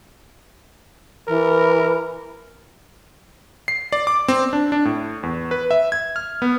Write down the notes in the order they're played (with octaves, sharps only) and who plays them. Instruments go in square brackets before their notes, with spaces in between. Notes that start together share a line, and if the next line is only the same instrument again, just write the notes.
[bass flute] E3 [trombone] A#4
[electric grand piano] C7
D5
D6
C4
D4
D4
A2
E2
B4
E5
G#6
F6
B3